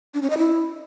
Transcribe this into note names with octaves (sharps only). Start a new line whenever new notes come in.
D4
C#4
D#5
E4